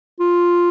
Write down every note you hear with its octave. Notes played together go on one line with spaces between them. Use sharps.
F4